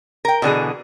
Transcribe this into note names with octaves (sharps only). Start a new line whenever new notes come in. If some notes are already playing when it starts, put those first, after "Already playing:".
A#4 G5
B2 D3 E3 G#4